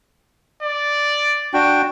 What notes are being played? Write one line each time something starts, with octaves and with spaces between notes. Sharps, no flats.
D5
D4 F#4 G5